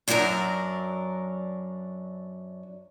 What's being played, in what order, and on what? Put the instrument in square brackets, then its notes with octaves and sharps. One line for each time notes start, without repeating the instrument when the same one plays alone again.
[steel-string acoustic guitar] F#2 F#3 D4 F4 A#4